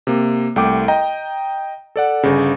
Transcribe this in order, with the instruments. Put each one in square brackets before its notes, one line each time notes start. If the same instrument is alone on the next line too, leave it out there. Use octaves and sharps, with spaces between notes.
[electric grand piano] C3 A#3
C2 A3 G5 D6
D#5 G5 A#5
A4 D5 F#5
G1 C#3